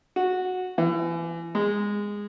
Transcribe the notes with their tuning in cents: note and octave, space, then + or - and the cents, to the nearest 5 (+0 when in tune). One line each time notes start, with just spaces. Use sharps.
F#4 -10
E3 +30
G#3 -15